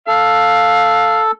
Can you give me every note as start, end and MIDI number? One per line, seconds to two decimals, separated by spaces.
0.07 1.31 69
0.07 1.21 77